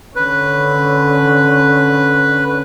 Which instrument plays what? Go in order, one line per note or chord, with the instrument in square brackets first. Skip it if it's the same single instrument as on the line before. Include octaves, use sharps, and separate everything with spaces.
[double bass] D3 C#4 [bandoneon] B4